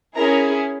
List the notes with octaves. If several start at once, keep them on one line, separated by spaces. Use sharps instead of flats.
C#4 E4 G#4 A#4 A#5